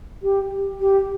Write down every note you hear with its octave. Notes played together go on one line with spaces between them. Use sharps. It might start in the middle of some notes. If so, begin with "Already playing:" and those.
G4
G4